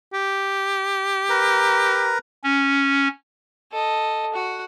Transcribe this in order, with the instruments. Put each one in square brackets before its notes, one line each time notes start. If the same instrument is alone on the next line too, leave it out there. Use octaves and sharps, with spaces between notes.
[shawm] G4
[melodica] A#4 B4 A#5
[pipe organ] C#4
[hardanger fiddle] A4 D#5
F#4 F#5